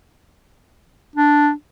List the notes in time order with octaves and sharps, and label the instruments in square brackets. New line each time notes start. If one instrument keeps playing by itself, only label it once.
[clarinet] D4